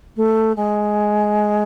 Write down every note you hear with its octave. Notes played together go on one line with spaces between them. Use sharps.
A3
G#3